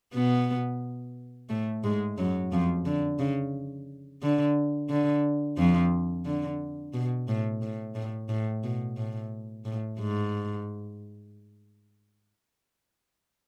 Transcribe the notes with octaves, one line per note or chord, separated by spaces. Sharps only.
B2 B3
A2 A3
G#2 G#3
F#2 F#3
F2 F3
D3
C#3
D3
D3
F2 F3
D3
B2
A2
A2
A2
A2
B2
A2
A2
G#2